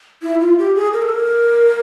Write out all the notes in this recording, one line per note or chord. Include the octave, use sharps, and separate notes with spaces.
E4
F4
G4
G#4
A#4
A4
A#4